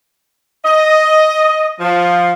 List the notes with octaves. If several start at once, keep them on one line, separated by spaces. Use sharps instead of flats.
D#5
F3